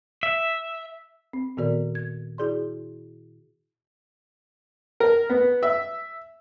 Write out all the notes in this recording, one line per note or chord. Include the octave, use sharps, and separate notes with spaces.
E5
C4
A#2 D#3 B3 F#4 A#4 D5
G#6
E4 F#4 G#4 D5 C6
A#4
B3
E5